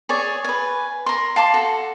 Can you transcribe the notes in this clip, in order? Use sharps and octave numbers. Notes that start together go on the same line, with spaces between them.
G#4 C#5 D5
B4 G#5
A#4 C6
F5 A5 C6 D6
F#4 A4